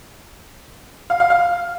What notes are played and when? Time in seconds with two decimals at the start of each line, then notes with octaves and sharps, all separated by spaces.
1.10 F5
1.20 F5
1.30 F5